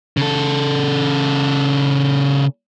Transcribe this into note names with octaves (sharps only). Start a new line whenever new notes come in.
C#3 A4